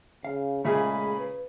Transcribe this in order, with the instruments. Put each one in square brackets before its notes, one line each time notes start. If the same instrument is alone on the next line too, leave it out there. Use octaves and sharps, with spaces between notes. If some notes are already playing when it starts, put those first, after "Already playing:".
[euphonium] C#3 [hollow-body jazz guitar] F5
[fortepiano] A#2 C#3 G#4 [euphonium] G#3 [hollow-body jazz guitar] A3 E5 [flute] B5
[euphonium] B4